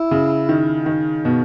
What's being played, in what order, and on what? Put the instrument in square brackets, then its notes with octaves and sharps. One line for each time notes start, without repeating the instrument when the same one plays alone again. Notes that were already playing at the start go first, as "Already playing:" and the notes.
Already playing: [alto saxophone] E4
[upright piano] C#3
D#3
D#3
B2